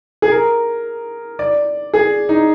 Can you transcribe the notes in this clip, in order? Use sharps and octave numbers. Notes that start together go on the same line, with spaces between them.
G#4
A#4
D5
G#4
D#4